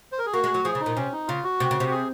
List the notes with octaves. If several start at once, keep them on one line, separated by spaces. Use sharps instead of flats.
C5
A#4
G#4
A#3 F#4
G#3
F#3
F3 G#4
C#3
D#4
A#2
C3 C#4
D#4
C#3 F4
F#4
C3
C#3
C3
G#4